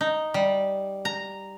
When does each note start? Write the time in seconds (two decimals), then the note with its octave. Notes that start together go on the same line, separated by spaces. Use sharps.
0.01 D#4
0.34 G3
1.05 A#5